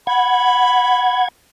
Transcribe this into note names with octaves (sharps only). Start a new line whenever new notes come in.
F#5 B5 G#6